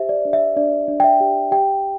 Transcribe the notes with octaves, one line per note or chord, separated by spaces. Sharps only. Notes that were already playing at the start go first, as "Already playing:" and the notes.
Already playing: G4 C5 E5
D5
D4
E5
D4 D5
D4
G5
E5
G4
G4 G5